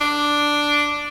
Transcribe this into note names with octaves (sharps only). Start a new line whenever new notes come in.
D4